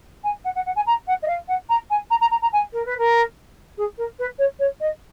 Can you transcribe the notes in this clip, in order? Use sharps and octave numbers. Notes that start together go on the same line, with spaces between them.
G#5
F#5
F#5
F#5
G#5
A#5
F#5
D#5
F5
F#5
A#5
G#5
A#5
A#5
A#5
A#5
G#5
A#4
B4
A#4
G#4
A#4
B4
C#5
C#5
D#5